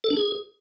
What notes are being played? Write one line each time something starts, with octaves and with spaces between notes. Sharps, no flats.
A4
D4
G#4